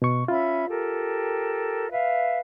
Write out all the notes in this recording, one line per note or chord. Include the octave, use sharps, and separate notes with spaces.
B2 C#6
C#4 F4 E5 B5
G4 A4 A#4
B4 E5 F5